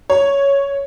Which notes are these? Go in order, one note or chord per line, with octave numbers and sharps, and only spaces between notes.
C#5